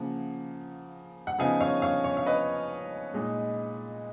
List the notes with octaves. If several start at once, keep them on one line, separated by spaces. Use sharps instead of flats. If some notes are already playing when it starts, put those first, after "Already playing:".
Already playing: C#3 F3 A#3 F#5
F#5
C#3 F3 B3 D#4 F5 G#5
C#5 F5
C#5 F5
C#5
F5
B4 D#5
A#2 G#3 D#4